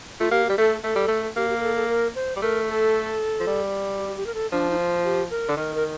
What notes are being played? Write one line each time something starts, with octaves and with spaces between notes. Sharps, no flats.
A3 F4
A#3 G4
G3 G4
A3 A4
A3 A4
G3
A3
A#3 G4
G4
A#4
A4
A4
A#4
C5
G3
A3 A#4
A4
F3
G3
G4
G4
A#4
A4
F3 D4
D#4
F4
G4
A#4
D3
D#3 A#4
A#4